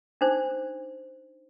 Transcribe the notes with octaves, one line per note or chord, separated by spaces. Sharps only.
D4 D#4 C5